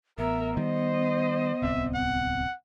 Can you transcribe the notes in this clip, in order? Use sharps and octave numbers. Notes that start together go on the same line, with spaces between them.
A1 B3 A#4 E5
D#3 G3 C5 D#5
D1 C2 C4 E5
F#5